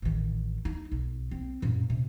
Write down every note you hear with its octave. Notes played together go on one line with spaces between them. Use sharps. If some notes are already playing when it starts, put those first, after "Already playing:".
A1 D#3
D#4
B1
C4
F#2 A#2
C3